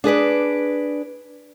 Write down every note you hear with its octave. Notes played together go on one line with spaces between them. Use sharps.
D4 G#4 B4 D5